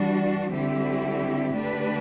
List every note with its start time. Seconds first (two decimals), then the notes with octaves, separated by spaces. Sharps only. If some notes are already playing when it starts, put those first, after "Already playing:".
Already playing: E3 G3 D4 F#4
0.52 D3 G3 C4 E4 G4
1.54 D3 A3 D4 G4 B4